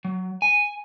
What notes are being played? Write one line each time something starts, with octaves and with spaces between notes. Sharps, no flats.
F#3
G#5